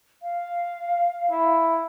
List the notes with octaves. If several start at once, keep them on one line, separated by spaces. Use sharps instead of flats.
F5
E4